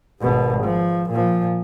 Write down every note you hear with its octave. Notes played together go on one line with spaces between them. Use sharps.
G#1 B2
F3
A#2 F3